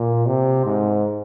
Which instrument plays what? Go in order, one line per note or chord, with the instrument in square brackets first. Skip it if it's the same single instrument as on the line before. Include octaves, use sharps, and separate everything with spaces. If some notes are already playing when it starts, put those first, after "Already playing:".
Already playing: [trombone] A#2
C3
G#2